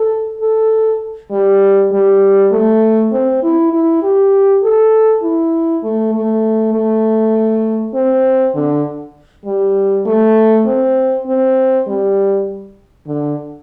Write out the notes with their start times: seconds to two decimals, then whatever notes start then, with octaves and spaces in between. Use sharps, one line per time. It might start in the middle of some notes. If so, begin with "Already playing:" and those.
Already playing: A4
0.41 A4
1.31 G3
1.92 G3
2.52 A3
3.12 C4
3.43 E4
3.73 E4
4.03 G4
4.63 A4
5.23 E4
5.83 A3
6.14 A3
6.73 A3
7.95 C4
8.55 D3
9.46 G3
10.06 A3
10.66 C4
11.26 C4
11.87 G3
13.07 D3